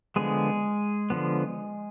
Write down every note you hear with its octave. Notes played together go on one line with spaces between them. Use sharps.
D3 F3 G#3 B3 G#4
D3 F3 B3